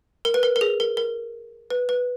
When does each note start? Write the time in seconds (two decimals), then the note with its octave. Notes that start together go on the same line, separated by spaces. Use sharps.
0.25 A#4
0.34 B4
0.43 A#4
0.56 A#4
0.61 G#4
0.80 A#4
0.97 A#4
1.70 B4
1.89 B4